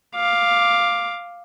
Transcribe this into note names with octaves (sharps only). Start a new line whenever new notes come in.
F5 D6